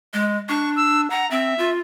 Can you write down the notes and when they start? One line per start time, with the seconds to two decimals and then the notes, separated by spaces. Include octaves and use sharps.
0.13 G#3
0.49 D4 C#6
0.76 E6
1.10 F#5 A#5
1.31 C4 E5
1.58 F4